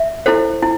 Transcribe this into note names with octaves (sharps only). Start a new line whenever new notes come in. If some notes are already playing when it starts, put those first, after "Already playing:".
Already playing: E5
E4 A4 C5
E4